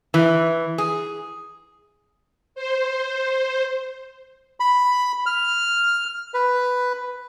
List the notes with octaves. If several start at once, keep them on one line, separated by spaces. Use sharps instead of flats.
E3
G#4
C5
B5
F6
B4